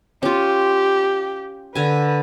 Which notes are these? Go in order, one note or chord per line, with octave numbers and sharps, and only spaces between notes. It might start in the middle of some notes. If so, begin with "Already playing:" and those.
C#4 F4 G4
D3 B4 G#5